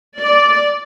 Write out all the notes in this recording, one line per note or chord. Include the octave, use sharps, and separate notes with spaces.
D5